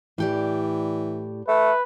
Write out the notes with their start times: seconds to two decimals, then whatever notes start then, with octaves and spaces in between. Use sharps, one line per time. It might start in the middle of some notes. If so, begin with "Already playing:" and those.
0.18 A2 E3 G4 D5
1.48 A3 B4